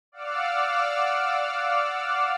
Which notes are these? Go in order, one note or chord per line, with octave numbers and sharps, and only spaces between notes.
D5 F5 F#5 D6 E6 F6